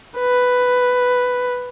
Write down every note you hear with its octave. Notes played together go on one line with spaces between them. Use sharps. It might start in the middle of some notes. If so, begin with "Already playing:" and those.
B4